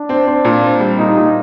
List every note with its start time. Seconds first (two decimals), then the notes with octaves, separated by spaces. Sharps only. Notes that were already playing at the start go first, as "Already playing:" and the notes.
Already playing: D4
0.09 C4
0.27 C4
0.45 A#2
0.63 C4
0.80 G3
0.98 A#2 D#4
1.17 A#2